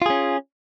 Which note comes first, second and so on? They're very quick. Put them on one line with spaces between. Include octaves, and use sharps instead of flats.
F4 G#4 C#4